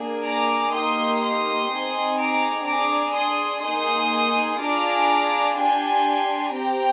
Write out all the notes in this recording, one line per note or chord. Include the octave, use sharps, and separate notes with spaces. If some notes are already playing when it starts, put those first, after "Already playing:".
Already playing: A#3 D4 G#4
A#5 D6
A#3 D#4 G4 C6 D#6
C6 D#6
C4 D#4 G#4
A#5 D6
D4 G#4 A#5 D6
C6 D#6
A#3 D#4 G#4 C6 D#6
D4 F4 G#4 A#5 D6
D4 G4 G#5 C6
C4 G4 G5 A#5